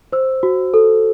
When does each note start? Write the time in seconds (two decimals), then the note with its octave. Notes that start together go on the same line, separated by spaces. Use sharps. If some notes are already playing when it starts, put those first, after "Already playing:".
0.13 C5 E6
0.43 F#4
0.74 A4